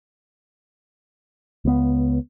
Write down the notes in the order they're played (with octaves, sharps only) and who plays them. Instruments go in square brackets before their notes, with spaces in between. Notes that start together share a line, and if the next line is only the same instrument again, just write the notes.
[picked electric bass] C#2 B3